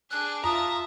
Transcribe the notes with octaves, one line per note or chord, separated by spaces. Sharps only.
D4 G#4 F#6
F4 E5 A5 A#5 D#6